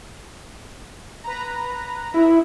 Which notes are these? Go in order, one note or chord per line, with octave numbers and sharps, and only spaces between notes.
B4 A#5
E4